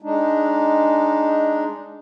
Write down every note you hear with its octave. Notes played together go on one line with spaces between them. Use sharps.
G#3 D4 D#4